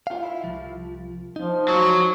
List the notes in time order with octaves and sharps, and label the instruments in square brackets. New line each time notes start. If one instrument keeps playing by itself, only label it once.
[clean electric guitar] F4 F5
E4
C2 F3
[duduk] F3 [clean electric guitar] D#4
[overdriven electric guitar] F#3